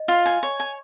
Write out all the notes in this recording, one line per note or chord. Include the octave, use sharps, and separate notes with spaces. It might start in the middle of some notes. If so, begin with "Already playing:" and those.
Already playing: D#5
F4
G#5
C#5
G#5